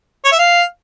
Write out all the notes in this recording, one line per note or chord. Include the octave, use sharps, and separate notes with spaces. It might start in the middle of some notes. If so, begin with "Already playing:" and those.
C#5
E5
F5